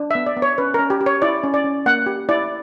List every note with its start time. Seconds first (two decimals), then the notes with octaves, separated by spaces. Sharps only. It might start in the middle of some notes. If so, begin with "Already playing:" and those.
Already playing: D4
0.11 B3 E5
0.26 D5
0.37 B3
0.42 C#5
0.58 C#4 B4
0.74 C#4 A#4
0.90 G4
1.01 G4
1.06 C#5
1.22 E4 D5
1.43 C#4
1.54 D5
1.64 C#4
1.86 A#3 F#5
2.06 G4
2.29 E4 D5